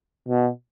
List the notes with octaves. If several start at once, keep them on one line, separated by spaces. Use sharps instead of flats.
B2